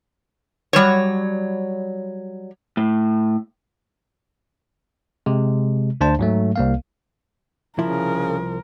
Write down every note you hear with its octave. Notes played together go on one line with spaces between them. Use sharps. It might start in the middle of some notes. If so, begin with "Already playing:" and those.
F#3 G3 C5 C#5
A2
C3 G#3
D2 D4 C5 A5
G#2 F#3 A3
C2 A#3 F5
C2 C#3 F3 E4 A#4